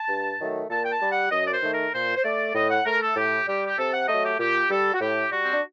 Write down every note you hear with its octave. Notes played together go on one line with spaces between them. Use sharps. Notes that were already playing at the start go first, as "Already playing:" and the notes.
Already playing: A5
G2
D#3 F#3 A3
A#2 A5
G5
A5
G3
F#5
F#2 D#5
D5
C5
D#3 A3
A#4
A#2 C5
C5
A3 D5
A2 D#5
F#5
A3 A#4
A4
A2 G4
G3 G4
G4
C3 A4
F#5
F#3 A3 D#5
G4
A#2 G4
G3 A4
F#4
A2 G4
G3 F#4
C4
D4